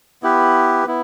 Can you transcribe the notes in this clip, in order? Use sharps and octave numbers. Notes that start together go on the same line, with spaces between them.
B3 E4 G4 B4
B3 E4